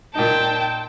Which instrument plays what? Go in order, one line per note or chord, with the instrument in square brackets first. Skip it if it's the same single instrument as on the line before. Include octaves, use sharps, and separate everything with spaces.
[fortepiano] A#2 D#4 [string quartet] G5 A5